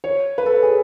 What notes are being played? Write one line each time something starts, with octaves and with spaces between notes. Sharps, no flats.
C#5
B4
A4
G#4